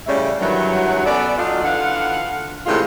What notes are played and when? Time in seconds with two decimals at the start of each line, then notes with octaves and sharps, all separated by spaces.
0.07 A2 C#3 G3 A3 C#4 E5
0.40 G2 D#3 E3 F#3
1.05 B3 C#4 A4 D5
1.38 F#3 D4 D#4 F4
1.64 D3 E3 F4 F5 F#5
2.66 A2 C3 D#3 E3 G#3 F4